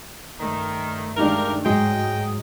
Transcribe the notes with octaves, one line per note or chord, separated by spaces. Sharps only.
G2 D#3 A3
D#3 F3 G#3 D4 G4 A#4
G#2 F#3 G#3 D#5 G5